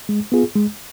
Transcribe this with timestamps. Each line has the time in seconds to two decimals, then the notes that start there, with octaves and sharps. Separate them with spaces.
0.09 G#3
0.32 B3 F4 G#4
0.56 G#3